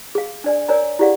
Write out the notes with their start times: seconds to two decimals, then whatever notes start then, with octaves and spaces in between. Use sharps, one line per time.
0.15 G#4 F5
0.44 D4 D5 G#5
0.68 A#4 C#5 D5 G#5 A#5
0.99 E4 G4 G#4 D5 F5 F#5